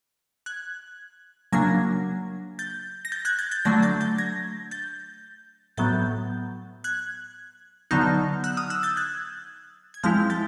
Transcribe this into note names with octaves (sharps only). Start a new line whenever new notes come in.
F#6 G#6
C#3 F#3 A#3 D4 G#6 A#6
G6 A6
A#6
G6 A6
F#6 G#6
G6 A6
G6 A6
D3 F#3 A3 D4 G#6 A#6
G6 A6
G6 A6
G#6 A#6
G6 A6
A2 F#3 B3 G6 A6
F#6 G#6
D3 F#3 B3 D#4 F6 G6
E6 F#6
D#6 F6
E6 F#6
G6 A6
F#6 G#6
G#6
F3 G#3 C4 E4 F6 G6
G6 A6